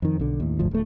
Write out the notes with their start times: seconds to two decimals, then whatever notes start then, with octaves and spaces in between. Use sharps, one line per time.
0.02 F2 D#3
0.19 B1 D3
0.40 D#2 A2
0.59 D1 G1 D2 F3
0.71 D1 A3